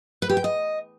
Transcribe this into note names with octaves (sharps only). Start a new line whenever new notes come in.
B4
G4
G5
D#5